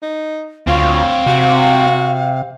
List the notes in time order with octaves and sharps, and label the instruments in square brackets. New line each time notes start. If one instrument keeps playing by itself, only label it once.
[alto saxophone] D#4
[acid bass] D2 [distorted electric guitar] C4 C#5 [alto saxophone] F4 [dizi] F5
[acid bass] C3 [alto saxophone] F#4